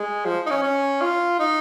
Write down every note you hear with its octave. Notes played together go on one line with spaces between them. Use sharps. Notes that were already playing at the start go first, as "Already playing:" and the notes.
Already playing: G#3
F3
D#4
C#4
C#4
F4
D#4